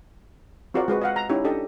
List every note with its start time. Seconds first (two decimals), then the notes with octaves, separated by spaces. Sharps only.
0.74 C4 F4 F#4 G#4 A#4 D5
0.88 G#3 F#4 B4
1.02 D#5 F5 F#5
1.16 A#5
1.29 C#4 D#4 E4 G4
1.44 D4 G4 A4 D#5